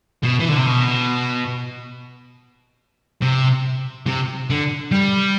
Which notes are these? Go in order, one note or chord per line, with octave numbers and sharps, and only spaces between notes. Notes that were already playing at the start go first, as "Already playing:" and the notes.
B2
E3
D3
C3
B2
C3
C3
D3
G3